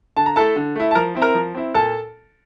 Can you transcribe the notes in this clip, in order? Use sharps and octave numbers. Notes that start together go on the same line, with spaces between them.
D3 A5
A#5
A3 E4 A4 A5
D3
A3 E4
A5
F3 A#4 A#5
C4 E4
A#4 A#5
F3
C4 E4
A#2 A4 A5